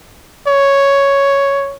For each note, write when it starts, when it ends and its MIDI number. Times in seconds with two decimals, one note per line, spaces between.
0.47 1.76 73